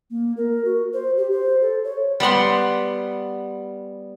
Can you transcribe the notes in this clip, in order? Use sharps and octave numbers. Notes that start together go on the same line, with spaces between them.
A#3
A#4
F#4
C5
G4
C5
A4
C#5
G3 B3 F#5 C6